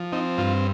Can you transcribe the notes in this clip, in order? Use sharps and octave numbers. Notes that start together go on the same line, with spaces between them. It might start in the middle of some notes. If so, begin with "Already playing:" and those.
Already playing: F3
C4 D#4
G2 F4